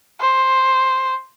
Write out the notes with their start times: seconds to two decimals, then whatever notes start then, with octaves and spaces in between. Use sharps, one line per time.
0.21 C5